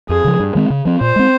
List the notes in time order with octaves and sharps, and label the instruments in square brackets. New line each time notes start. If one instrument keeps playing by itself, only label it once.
[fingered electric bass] F2 [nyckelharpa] G#4
[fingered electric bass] C#3 F3
G2
D#3 G#3 C4
C#3
F3 C4
[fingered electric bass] A#2 [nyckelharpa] C5
[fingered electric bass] G#3 C4